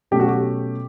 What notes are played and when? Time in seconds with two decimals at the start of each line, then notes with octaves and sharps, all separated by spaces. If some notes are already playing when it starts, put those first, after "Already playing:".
0.11 B2 F#3 A3 C#4 G4
0.20 F#4
0.28 G4